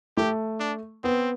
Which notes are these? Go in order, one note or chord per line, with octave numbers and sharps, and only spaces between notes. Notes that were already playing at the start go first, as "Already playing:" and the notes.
A3 G4
D4
B3 C4